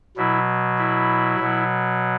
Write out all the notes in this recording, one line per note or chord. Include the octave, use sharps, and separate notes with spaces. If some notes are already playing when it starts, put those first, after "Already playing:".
B2 F#3 E4
E4
B2 F#3